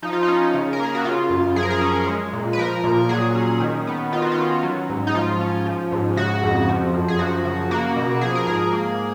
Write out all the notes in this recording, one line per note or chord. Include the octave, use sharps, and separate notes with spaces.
F3 D#4
F4
D#4
C#4
C#3
A#4
A#3 G#4
F#4
C#3 F4
F#2
F3 G#4
A#4
G#4
C#4
G#3
A#2
B4
F3 A#4
A#2
F#3 G#4
C#4
D#3
B3
D#3 F4
F#4
F4
C#4
F#3
G#2
D#4
F3 F4
C#4
F3
G#2
C#3 F#4
F2
F3
F#2
G#4
F3 F#4
C#3
A#3 F#4
B2
F3 G#4
A#4
G#2 G#4
A#3